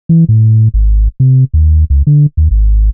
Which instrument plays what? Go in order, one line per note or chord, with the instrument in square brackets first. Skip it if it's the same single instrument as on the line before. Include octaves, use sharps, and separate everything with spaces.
[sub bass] E3
A2
G#1
C3
D#2
C#2
D3
D#2
G#1